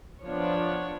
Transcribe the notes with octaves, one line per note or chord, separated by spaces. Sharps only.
F3 B3 D4 C#5